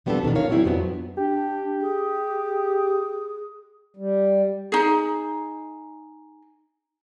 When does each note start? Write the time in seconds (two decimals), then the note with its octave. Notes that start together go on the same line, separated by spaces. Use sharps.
0.06 F3 G3 B3 C4 D4 A4
0.23 B2 D#3 E3 D4
0.35 F3 A#4 C#5 F5
0.49 F#3 G3 C4 E4 G#4
0.64 F2 F3 F#3 B3 D4
1.17 D4 G4
1.81 G#4
3.97 G3
4.72 D#4 G#4